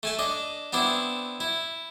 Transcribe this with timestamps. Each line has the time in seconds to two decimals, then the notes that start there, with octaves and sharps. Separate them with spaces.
0.03 A3 G#5 A5
0.19 D4 D#5
0.73 B3 C4 D4 E4
1.40 E4